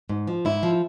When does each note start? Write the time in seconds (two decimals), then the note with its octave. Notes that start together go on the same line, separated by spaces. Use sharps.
0.09 G#2
0.27 F3
0.45 G#2 E4
0.63 F3